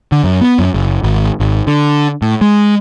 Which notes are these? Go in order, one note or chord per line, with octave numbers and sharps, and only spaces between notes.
D3
F#2
B3
F#2
F#1
G#1
G#1
D3
A2
G#3